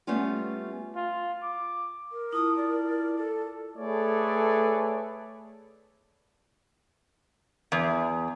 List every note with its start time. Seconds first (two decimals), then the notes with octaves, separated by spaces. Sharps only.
0.07 G3 A3 B3 C#4 F4
0.96 F4
1.43 D6
2.12 A#4
2.33 E4 F4 A5 D#6
2.57 D5
3.18 A4
3.76 A3 G#4 A4 B4 C#5 D5
7.72 E2